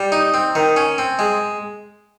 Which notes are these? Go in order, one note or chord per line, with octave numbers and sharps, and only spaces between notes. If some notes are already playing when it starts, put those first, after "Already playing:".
Already playing: G3
D#4
C4
D#3
C#4
C4
G#3